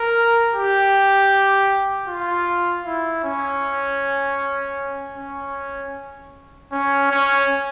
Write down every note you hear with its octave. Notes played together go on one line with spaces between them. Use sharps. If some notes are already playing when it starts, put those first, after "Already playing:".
Already playing: A#4
G4
F4
E4
C#4
C#4
C#4
C#4